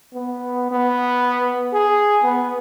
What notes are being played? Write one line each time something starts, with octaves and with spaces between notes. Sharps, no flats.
B3
B3
G#4
B3